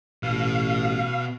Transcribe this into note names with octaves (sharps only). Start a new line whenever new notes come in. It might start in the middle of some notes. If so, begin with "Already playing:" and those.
A1 B2 F5